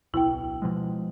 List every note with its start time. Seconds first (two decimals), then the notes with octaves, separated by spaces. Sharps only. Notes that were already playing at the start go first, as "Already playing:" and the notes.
0.14 D1 B1 E4 G5
0.62 B2 F3 G#3